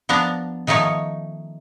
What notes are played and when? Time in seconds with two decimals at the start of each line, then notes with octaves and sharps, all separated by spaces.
0.09 F3 B3 D4 A5 A#5
0.67 D#3 F3 A3 D#4 C#5